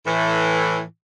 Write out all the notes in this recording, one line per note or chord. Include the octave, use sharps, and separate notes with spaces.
A2 E3